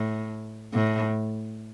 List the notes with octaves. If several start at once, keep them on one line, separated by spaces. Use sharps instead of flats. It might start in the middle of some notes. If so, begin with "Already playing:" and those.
Already playing: A2
A2